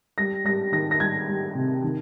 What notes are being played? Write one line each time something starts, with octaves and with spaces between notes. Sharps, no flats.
G3 A#6
G3 A#6
D#3 A#6
A#6
G3 G#6
G3
C3
D#3